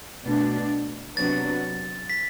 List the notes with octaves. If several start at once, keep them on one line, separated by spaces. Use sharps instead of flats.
B2 A3 D4
C3 F#3 B3 D4 F#4 A6
B6